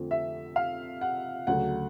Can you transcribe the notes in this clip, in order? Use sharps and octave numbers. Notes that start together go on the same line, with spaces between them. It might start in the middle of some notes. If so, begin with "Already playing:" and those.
Already playing: F2 D3 F3 A3
E5
F5
F#5
D2 C#3 F#3 A3 F#5